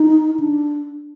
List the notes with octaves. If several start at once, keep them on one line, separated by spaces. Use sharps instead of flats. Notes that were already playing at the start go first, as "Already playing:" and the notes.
Already playing: D#4
D4